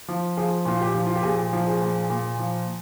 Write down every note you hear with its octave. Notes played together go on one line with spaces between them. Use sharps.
F3
F3 G#4
A#2 F4
G4
F3
F4
G4
A#2 G#4
F3
G#4
A#2
A#2
F3